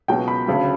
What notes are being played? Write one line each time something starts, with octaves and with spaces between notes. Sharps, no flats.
C#2 B2 F#3 G5
B5
D2 C#3 F#3